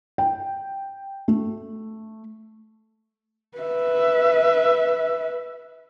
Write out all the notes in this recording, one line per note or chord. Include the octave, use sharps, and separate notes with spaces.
G5
A3
B4 E5